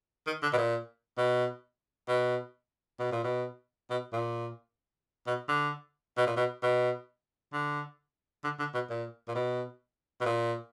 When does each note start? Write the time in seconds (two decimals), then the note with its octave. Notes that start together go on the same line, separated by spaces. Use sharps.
0.27 D#3
0.42 D3
0.53 B2
0.57 A#2
1.17 B2
2.08 B2
3.00 B2
3.12 A#2
3.24 B2
3.90 B2
4.13 A#2
5.27 B2
5.49 D3
6.17 B2
6.27 A#2
6.36 B2
6.62 B2
7.53 D3
8.44 D3
8.59 D3
8.74 B2
8.90 A#2
9.28 A#2
9.35 B2
10.21 B2
10.25 A#2